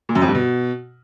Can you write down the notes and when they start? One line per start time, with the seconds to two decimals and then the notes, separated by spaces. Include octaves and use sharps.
0.09 A#2
0.15 F#2
0.22 F2
0.28 G2
0.35 B2